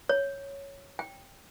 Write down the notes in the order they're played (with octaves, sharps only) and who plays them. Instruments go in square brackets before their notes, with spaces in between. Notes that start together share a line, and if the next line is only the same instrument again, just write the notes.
[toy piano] C#5
G5